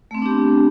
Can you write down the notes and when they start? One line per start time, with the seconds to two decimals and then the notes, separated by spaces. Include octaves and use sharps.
0.11 A3
0.15 C4
0.18 B3
0.22 D4
0.26 G4